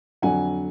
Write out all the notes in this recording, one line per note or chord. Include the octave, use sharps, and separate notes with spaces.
F2 D3 F#3 F#5 G#5